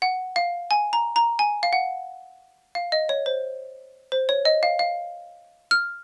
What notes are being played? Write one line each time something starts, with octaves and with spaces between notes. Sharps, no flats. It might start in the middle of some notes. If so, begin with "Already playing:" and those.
F#5
F5
G#5
A#5
A#5
G#5
F5
F#5
F5
D#5
C#5
C5
C5
C#5
D#5
F5
F5
F6